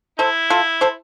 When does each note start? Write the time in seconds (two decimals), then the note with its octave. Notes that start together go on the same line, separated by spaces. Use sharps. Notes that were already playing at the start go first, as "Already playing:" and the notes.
0.19 E4 A4 C5
0.50 F4 A4
0.81 A4 C5